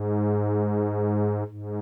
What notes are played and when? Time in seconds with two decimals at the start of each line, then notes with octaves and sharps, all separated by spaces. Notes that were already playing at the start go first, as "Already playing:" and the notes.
Already playing: G#2
1.47 G#2